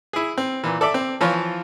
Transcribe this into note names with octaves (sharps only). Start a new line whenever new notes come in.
E4 G#4
C4
A#2 E3
A4 D5 E5 D6
C4
E3 F3 F4 C#5